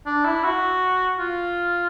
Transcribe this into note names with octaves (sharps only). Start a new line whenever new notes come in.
D4
E4
F#4
F4